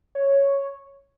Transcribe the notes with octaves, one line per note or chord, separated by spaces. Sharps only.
C#5